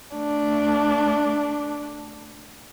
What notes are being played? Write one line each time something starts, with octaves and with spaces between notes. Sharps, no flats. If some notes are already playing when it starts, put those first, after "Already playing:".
A3 D4